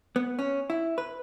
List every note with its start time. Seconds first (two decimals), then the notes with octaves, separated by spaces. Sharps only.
0.16 B3
0.39 C#4
0.70 E4
0.98 B4